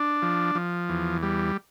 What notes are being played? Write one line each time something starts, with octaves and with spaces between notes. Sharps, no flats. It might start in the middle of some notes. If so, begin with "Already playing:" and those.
Already playing: D4
F3
F3
E2
G3